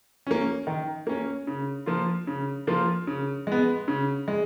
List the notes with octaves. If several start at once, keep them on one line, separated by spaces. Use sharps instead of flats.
A#3 C#4
D#3
A#3 C#4
C#3
F3 A#3 F4
C#3
F3 A#3 F4
C#3
G#3 B3
C#3
G#3